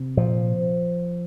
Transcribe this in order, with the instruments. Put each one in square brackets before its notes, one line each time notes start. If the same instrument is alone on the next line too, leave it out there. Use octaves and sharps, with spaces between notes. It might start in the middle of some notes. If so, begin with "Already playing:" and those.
Already playing: [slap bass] C3
A#2 F3